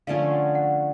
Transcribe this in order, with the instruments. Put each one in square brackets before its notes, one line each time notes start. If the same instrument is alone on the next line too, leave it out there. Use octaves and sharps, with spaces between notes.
[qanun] D3 F3 A3 C#4 [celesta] F5
[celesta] F#5
F#5